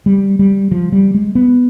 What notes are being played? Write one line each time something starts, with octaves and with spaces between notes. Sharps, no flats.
G3
G3
F3
G3
G#3
B3